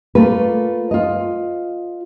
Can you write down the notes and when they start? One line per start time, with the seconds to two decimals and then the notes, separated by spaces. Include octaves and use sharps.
0.15 A3 A#3 F4 B4
0.91 F4 D#5